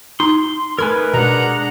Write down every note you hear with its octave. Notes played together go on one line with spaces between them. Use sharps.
D#4 C6
A3 D#4 A#4 B4 G#5 B5 G#6
B2 G#3 D4 F#5 A#5